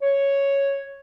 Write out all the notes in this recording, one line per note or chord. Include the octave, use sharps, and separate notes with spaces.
C#5